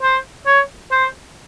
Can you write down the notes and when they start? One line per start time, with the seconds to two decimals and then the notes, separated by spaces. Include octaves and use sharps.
0.02 C5
0.46 C#5
0.91 C5